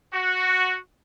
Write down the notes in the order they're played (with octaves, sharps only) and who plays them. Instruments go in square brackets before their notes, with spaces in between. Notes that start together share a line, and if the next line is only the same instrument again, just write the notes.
[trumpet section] F#4